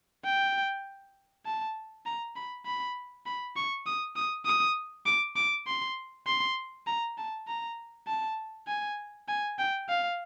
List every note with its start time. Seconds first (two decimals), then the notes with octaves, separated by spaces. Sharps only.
0.25 G5
1.46 A5
2.06 A#5
2.35 B5
2.66 B5
3.26 B5
3.56 C#6
3.86 D#6
4.16 D#6
4.46 D#6
5.06 D6
5.36 D6
5.67 C6
6.27 C6
6.87 A#5
7.18 A5
7.47 A#5
8.07 A5
8.67 G#5
9.28 G#5
9.58 G5
9.89 F5